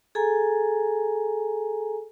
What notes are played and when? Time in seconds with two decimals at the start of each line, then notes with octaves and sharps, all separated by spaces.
0.15 G#4 A4 G#5 A#5